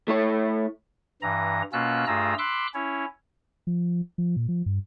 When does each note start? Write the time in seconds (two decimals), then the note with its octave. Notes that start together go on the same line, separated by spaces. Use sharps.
0.08 A3 E4 C#5
1.22 G2 E3 A#5
1.73 B2 A#3 C#4 F4 E6 F#6
2.07 G2 A3 F4 G#4 A#5 E6
2.38 B5 C6 D6 E6 F#6
2.74 C#4 E4 C#5
3.67 F3
4.18 F3
4.36 A#2
4.48 F3
4.66 G2